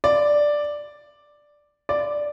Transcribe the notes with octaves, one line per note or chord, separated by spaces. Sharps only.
D5
D5